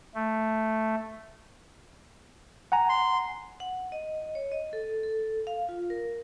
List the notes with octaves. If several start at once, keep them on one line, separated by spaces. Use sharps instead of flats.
A3
F#5 G#5 A#5
C6
F#5
D#5
C#5
D#5
A4
A4
F5
F4
A#4